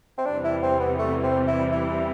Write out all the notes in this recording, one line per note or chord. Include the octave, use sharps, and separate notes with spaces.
C4
E2 C3 E3 G3 D4
E4
C4
B3
A3
C4
E4
E4